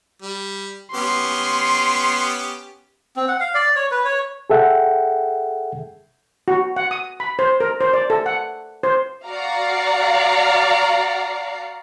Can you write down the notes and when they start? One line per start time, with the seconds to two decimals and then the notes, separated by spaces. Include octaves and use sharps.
0.22 G3
0.94 B3 C#4 G4 C6
3.16 C4
3.28 F#5
3.40 F5
3.55 D5
3.76 C#5
3.91 B4
4.05 C#5
4.50 G#4 A4 E5 F#5 G5
6.48 F#4
6.76 F#5
6.91 D#6
7.20 B5
7.39 C5
7.60 A#4
7.81 C5
7.93 D5
8.10 A4
8.26 F#5
8.83 C5
9.25 F#4 D5 F5 F#5 A#5 C7